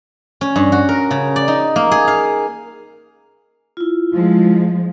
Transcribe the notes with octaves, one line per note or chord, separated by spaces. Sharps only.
C#4
G2
F#4
A#4
C#3
D5
D#4
A#3
G#4
F5
E4 F4
F3 G#3